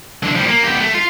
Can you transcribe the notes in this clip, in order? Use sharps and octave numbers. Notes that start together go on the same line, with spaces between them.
E3 D4
F3 G3
A#3
B3 G4
A3
F4